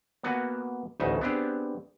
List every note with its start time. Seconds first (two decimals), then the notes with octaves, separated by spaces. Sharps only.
0.23 A#3 B3 F#4 F#5 G#5
1.00 A1 D2 C#3 D#4 E5 G#5
1.21 B3 C4 D4 G4 G#4